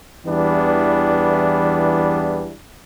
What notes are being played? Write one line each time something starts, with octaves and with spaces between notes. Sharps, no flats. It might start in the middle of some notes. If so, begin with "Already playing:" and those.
E2 E3 G3 B3 D4